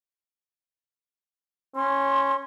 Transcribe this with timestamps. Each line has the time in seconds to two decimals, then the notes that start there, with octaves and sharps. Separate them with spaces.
1.76 C#4 C6